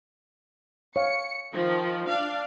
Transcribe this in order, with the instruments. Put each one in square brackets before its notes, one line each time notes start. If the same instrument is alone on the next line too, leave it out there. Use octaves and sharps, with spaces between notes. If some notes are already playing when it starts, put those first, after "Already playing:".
[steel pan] C#5 F5 [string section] C#7
[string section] D#3 F3
D4 F5